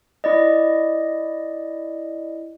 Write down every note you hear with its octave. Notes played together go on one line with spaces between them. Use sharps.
E4 D5 D#5